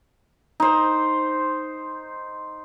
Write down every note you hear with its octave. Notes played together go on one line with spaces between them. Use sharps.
D#4 C5